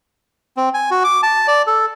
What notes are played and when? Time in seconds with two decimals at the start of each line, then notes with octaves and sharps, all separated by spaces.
0.57 C4
0.74 G#5
0.91 F#4
1.04 D6
1.23 A5
1.48 D5
1.67 A4